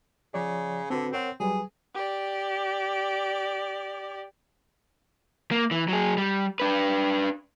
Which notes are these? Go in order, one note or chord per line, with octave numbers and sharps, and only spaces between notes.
C#3 F3 C#5 D5
D3 C4 F#4 B4
C4 A#4 C#5 F#5
F#3 G3 G#4 B4
G4 D5
A#3
E3
F#3 G#4
G3
D4 B4